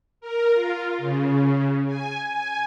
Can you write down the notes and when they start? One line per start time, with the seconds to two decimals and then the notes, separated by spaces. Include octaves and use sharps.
0.21 A#4
0.54 F4
0.98 C#3
1.87 G#5
2.34 G#5